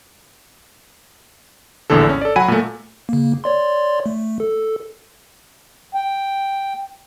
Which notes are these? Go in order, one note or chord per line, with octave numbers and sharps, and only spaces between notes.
A#1 E2 A2 D3 A4
C#4
A4 D5
F#3 F#5 G#5 B5 D#7
A#2 A3
C#3 A#3
C#5 D5 C6
A3
A4
G5